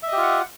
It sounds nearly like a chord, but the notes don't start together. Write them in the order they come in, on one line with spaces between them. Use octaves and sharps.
E5 D#5 G4 F4 F#5